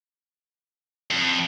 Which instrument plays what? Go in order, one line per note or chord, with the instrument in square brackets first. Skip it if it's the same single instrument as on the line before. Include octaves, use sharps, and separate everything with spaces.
[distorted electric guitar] F2